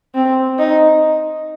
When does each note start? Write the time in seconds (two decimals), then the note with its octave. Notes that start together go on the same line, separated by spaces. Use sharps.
0.15 C4
0.59 D#4